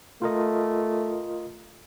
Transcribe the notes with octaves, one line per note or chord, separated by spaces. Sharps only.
A3 F4 A#4 D#5